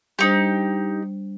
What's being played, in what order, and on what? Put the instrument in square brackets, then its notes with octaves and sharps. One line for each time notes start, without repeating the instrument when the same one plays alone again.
[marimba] G3 D4 C5 [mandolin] D#4 G4